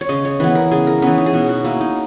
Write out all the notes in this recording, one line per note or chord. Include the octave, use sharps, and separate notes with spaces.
C#5
C#3 D#5
C#5
E3 B3 B4
A#4
C#3 G#4
A#4
E3 B3 C#4
D#4
G#4
B2 F#4
F#4
A#3 C#4 E4
D#4